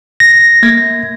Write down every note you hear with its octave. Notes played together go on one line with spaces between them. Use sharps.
A#6
A#3 G#6